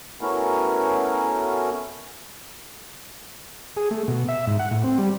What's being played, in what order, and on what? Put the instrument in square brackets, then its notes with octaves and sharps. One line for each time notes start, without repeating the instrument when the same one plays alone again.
[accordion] A3 B3 C#4 E4 F#4 A#4
[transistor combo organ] G#4
A3
B2
E5
G#2
F#5
A2
C4
G3